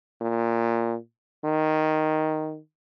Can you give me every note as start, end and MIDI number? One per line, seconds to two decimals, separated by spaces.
0.21 0.96 46
1.44 2.58 51